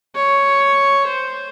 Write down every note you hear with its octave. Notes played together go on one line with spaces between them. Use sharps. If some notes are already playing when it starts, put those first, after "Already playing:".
C#5
C5